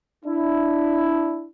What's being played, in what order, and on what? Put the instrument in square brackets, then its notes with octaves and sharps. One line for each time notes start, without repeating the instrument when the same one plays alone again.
[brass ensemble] D4 E4